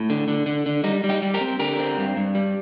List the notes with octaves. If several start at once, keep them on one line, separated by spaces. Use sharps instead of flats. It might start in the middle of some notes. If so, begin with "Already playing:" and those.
Already playing: A2
D3
D3
D3
D3
G3 D#4
G3
D#4 G4
G3
G4 A#4
C4
D3 G4 A#4
C4
G2
G2
G3